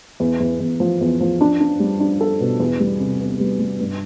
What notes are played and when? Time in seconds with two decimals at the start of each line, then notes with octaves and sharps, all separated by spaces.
0.20 E2
0.40 E2
0.60 E2
0.80 F3
1.01 E2
1.20 F3
1.41 D4
1.60 D4
1.80 G3
2.00 D4
2.21 A4
2.40 B2
2.60 E2
2.80 G3
2.99 C3
3.20 B3
3.40 G3
3.59 G3
3.80 G2